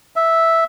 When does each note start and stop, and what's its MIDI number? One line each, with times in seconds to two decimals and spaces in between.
0.16 0.64 76